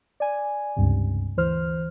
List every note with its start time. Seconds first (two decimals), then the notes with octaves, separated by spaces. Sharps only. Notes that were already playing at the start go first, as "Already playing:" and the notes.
0.20 D5 G#5
0.76 C#2 G2 C3
1.37 D2 E3 C5 F6